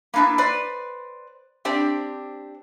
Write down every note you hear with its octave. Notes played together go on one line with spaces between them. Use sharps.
A#3 B3 D4 E4 A5
B4 C5 D5
C4 D4 G4 C5 D5